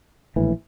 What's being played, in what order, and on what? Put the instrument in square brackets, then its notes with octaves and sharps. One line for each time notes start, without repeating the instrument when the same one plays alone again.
[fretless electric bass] A#1 A2 E3